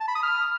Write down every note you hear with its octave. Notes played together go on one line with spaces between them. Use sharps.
A5
B5
D#6
F6